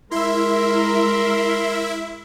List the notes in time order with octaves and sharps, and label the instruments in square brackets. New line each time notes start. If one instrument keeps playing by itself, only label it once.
[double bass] G#3 [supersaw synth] E4 E5 [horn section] A#4 [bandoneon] C6